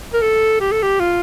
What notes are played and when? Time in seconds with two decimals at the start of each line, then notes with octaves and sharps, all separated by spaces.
0.14 A#4
0.22 A4
0.60 G4
0.71 A4
0.83 G4
1.00 F4